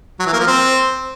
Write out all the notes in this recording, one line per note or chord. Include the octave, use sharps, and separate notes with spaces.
F#3
E3
A#3
F3
C4